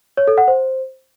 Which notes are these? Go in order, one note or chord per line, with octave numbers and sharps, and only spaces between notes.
C#5
A4
F#5
C5